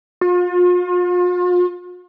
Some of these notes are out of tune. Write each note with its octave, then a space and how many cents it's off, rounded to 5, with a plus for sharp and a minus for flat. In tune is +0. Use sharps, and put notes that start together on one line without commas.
F4 +40